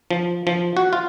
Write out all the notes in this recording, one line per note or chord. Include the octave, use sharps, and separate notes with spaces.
F3
F3
F#4
F4